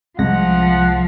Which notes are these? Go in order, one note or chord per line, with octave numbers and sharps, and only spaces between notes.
C2 F3 G#3 F#5 A#6